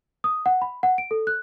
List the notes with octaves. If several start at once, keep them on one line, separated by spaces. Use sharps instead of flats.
D#6
F#5
B5
F#5
D7
A4
F#6